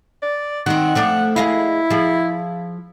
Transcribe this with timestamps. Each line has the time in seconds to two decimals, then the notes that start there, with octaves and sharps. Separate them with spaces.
0.23 D5
0.66 D#3 C4 F#5
0.95 F3 A3 D4
1.36 E4 G#4 D#5 F5
1.90 F3 G#4